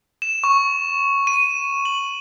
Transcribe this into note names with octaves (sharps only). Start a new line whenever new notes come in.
E7
C#6
D#7
F#7